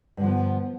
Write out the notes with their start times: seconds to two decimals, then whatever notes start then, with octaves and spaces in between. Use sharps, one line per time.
0.17 G2
0.20 D3
0.23 F3
0.26 B3